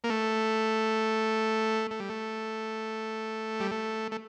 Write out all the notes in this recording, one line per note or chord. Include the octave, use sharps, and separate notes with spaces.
A#3
A3
A3
G3
A3
G3
A3
A3